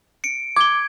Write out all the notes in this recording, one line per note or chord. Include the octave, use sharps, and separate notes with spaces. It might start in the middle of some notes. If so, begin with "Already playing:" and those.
C#7 D7
D6 G#6 G7